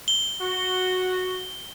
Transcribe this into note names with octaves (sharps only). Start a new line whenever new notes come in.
G7
F#4